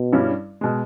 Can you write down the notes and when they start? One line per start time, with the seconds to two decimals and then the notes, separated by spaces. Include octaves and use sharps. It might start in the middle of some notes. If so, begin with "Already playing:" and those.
Already playing: B2
0.12 G2 G3 C#4 E4
0.61 B2 G#3